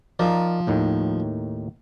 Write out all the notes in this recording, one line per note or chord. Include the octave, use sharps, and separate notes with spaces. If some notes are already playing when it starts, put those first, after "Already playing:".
F3 D#4 A#4 D5
D#2 A2 D#3